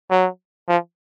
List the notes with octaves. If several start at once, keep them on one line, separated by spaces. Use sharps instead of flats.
F#3
F3